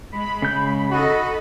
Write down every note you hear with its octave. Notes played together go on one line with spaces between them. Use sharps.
G#3 B5
C#3 G6
D#4 F#4 A4 D#5